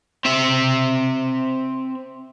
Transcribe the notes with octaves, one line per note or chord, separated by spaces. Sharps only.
C4 E5